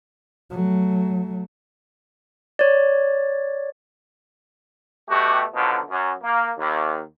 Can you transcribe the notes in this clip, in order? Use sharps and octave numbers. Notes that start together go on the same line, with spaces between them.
F#3 A3
C#5 D5
B2 A3 F#4 G4
B2 D3 D#3 F3 F#3
F#2
A#3
D#2